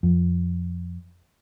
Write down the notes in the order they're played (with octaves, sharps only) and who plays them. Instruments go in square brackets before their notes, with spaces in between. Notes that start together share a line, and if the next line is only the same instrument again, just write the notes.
[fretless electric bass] F2